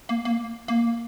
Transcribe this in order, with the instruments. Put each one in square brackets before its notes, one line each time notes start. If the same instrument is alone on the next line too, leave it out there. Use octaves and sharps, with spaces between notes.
[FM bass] A#3
A#3
A#3